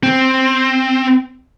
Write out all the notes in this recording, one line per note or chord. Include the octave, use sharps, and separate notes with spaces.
C4